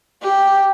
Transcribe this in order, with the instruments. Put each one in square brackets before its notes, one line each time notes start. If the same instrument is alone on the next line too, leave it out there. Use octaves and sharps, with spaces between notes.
[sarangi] G4